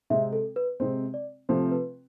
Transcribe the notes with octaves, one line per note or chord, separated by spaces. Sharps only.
C3 G#3 C4 E5
A4
B4
C3 G#3 C4 C5
D5
C3 F3 A3 C4 F4 C5
B4